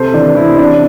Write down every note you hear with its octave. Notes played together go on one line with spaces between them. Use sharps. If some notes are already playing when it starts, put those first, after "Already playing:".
Already playing: C3 A4 C5
E3 D4
C3 E4
C3 D4